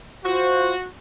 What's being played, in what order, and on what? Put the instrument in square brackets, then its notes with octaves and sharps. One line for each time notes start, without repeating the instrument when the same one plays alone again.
[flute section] F4 C5 [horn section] F#4